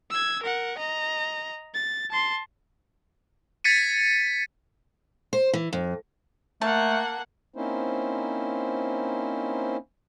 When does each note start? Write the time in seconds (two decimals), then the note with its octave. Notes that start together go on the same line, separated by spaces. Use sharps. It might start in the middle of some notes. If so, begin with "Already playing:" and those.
0.10 E6 G#6
0.43 A#4 F#5
0.77 D#5 A#5
1.74 A6
2.10 A5 C6
3.64 G#6 A6 B6 C#7 D#7
5.33 C5
5.53 E3
5.73 F2
6.61 A3 A#3 F#5 A5
7.55 A#3 C4 C#4 D#4 E4 C5